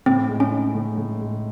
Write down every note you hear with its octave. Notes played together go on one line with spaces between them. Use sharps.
A2 C4
G#3
C#4
D#4
A2
A2
G#3